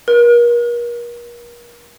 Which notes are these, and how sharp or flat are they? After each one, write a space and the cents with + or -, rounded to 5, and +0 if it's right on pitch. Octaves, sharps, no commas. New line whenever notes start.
A#4 +40